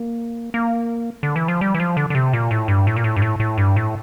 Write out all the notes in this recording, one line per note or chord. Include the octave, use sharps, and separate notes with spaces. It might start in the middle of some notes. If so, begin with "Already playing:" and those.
Already playing: A#3
A#3
D3
E3
F3
G3
E3
F3
D3
D3
C3
A#2
A2
G2
A2
A#2
A2
G2
A2
A2
G2
A2